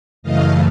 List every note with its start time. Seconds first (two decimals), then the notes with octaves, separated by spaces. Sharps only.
0.23 F#2 C#3 E3 A3 D#5 F5